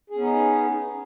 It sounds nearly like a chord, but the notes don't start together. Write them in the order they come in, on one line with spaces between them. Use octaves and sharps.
G#4 C#4 B3 D#4